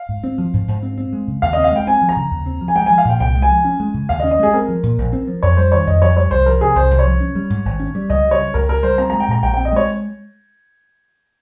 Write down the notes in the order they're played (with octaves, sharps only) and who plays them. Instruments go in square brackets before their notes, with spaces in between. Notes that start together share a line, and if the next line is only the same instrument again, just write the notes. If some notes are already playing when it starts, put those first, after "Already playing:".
Already playing: [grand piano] F5
[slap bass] G#2
C4
F3
G#2
G#2
C4
C4
G#3
C#3
[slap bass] D#2 [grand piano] F5
[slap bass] C4 [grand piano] D#5
[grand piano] F5
[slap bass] G#3 [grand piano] G5
[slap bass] C4 [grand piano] G#5
[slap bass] F3
[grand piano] A#5
[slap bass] C#3
D#2
C4
F3
[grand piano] G#5
[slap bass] G#3 [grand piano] G5
[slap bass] F3 [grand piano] G#5
[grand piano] F5
[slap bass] A#2 [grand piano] G5
[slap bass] C2 [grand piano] G5
[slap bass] G#3
[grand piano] G#5
[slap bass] F3
C#4
G#3
C#3
[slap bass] D#2 [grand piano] F5
[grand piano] D#5
[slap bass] C#4
[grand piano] D#5
[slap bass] G#3 [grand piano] G#4
[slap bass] C4 [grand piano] A#4
[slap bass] F3
A#2
A#1
C4
F3
[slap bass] F2 [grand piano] C#5
[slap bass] G3 [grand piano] C5
[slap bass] D#3 [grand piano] C#5
[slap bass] F2 [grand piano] D#5
[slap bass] F2 [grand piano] C#5
[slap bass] G3 [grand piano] C#5
[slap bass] C2 [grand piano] C5
[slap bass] F3 [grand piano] A#4
[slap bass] C3 [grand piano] G#4
[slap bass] C2 [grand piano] C5
[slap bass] C2
[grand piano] C#5
[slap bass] F3
C#4
G3
G#2
G#1
C#4
G3
[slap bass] C#2 [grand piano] D#5
[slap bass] G3
[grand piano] C#5
[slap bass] C#3
[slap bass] C#2 [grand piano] A#4
[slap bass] C#2 [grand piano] A#4
[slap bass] G3 [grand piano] C5
[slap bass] C4 [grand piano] A#5
[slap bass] G#3 [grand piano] A#5
[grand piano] G5
[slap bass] A#2 [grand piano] A#5
[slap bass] A#1 [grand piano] G5
[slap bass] C4 [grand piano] G5
[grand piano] D#5
[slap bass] G#3 [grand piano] C#5